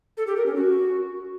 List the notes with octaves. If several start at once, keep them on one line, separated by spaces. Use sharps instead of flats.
A4
G4
A#4
C#4
F#4